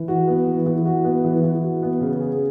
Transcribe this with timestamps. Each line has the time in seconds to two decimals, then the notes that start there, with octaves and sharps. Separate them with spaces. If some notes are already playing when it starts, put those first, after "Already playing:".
Already playing: E3
0.08 F#4
0.27 B3
0.47 E3
0.66 E3
0.86 F#4
1.05 B3
1.24 E3
1.43 E3
1.63 F#4
1.83 B3
2.01 C#3
2.21 G#4